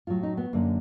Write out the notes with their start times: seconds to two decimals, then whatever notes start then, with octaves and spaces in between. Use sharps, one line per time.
0.07 A2 F#3 F4
0.23 D#4
0.37 B3
0.53 F#2 D3 F#3 A#3